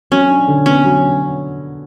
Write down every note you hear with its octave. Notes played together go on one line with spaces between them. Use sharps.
F#3 C#4
D4
D3
B3 C#4
F#3